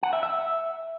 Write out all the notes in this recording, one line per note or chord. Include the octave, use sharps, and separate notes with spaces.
F#5
E5
E5